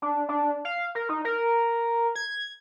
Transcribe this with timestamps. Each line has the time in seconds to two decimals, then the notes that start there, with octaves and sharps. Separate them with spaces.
0.02 D4
0.29 D4
0.65 F5
0.95 A#4
1.09 D#4
1.25 A#4
2.15 G#6